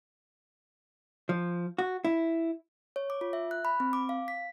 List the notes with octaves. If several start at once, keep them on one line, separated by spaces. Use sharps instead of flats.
F3
F#4
E4
C#5
D6
F4
E5
F#6
B5
C4
D6
F5
B6